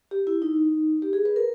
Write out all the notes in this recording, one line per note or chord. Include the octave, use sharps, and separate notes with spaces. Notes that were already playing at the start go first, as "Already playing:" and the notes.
G4
E4
D#4
G4
G#4
B4
A#4